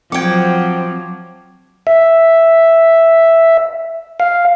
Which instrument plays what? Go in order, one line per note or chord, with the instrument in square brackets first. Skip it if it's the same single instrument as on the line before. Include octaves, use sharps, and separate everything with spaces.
[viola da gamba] F3 F#3 [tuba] C4 [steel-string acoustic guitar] F#5 G5 [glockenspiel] D6 G#6
[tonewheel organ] E5
F5